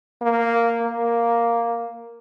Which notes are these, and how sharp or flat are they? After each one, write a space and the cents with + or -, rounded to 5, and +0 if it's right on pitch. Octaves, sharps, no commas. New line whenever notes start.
A#3 -5
A#3 +0